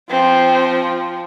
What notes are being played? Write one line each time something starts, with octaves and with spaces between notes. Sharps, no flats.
F3 C4